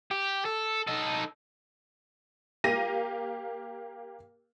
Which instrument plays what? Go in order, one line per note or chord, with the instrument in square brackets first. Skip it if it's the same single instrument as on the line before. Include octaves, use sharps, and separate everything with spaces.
[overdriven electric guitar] G4
A4
D#4 A4
[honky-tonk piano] A#3 G4 F5 A#6 D#7